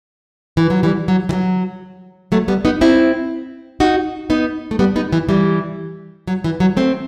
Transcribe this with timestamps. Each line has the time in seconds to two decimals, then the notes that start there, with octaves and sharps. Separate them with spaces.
0.57 E3
0.70 F#3
0.83 E3 G3
1.08 F#3
1.29 E3
1.33 F#3
2.32 F#3 A3
2.48 G3 B3
2.65 B3 D#4
2.81 C4 E4
3.80 D#4 F#4
4.30 B3 D#4
4.71 A3
4.79 G3 B3
4.96 B3 D#4
5.13 E3
5.29 E3 G3
6.27 F#3
6.44 E3
6.60 F#3
6.77 A3 C4